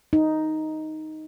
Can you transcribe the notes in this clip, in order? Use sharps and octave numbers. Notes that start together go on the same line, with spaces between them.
D#4